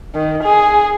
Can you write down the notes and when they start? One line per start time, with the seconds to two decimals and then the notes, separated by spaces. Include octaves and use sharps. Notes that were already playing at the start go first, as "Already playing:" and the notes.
0.15 D#3
0.43 G#4